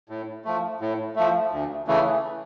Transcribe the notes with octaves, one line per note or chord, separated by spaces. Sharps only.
A2
F3 A3
A2
F3 A3
D2
C#3 E3 A3